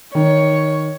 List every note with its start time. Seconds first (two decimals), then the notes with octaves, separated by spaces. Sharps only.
0.15 D#3 C#5